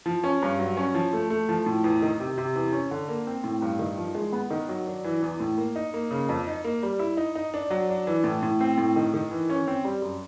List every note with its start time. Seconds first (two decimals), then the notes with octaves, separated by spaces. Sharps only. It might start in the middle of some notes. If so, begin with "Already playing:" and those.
0.06 F3
0.24 C#4
0.42 G2
0.59 F#3
0.77 C#4
0.94 F3
1.13 A3
1.30 A3
1.49 F3
1.66 A2
1.84 E2
2.02 D#3
2.20 C3
2.38 C3
2.56 E2
2.72 C#4
2.91 D3
3.08 A#3
3.27 C4
3.44 A2
3.62 G2
3.79 D#3
3.98 F3
4.15 G#3
4.33 B3
4.50 D#3
4.69 F#3
4.87 D4
5.04 E3
5.22 E2
5.40 A2
5.58 A#3
5.76 D#4
5.94 A#3
6.11 C#3
6.29 F2
6.47 D#4
6.64 A#3
6.83 G3
6.99 E4
7.17 D#4
7.35 D#4
7.54 D4
7.70 F#3
7.89 D4
8.07 E3
8.24 A2
8.43 A2
8.60 C4
8.78 A2
8.96 D#3
9.14 D#3
9.31 E3
9.50 C#4
9.67 C4
9.84 G3
10.02 F#2